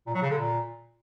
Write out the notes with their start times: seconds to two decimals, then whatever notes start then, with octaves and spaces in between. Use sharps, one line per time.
0.06 A#2
0.14 F#3
0.22 C#3
0.30 D3
0.38 A#2